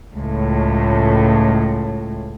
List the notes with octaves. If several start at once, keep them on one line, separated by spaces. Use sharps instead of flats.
C#2 A2